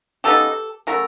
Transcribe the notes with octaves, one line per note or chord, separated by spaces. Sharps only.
C#3 F#3 B3 D#4 G4 A4
C#3 F#3 A3 A#4